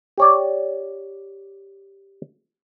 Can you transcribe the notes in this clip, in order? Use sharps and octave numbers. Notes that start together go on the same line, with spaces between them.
G4 C#5 D5